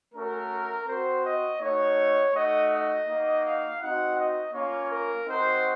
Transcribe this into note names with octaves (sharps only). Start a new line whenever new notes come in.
A3 C#4 F#4 A#4
C4 F#4 C5
D#5
A3 D#4 F#4 C#5
A3 D#4 F#4 D#5
D#5
A#3 D#4 F#4
F5
C4 D#4 F#4 F#5
D#5
A#3 C#4 F4 C#5
A#4
C4 D#4 F#4 C5